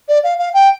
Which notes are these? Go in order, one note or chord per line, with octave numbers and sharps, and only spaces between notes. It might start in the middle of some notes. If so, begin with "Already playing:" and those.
D5
F5
F5
G5